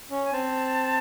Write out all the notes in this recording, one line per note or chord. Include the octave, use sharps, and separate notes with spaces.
C#4
G#5
C4 A5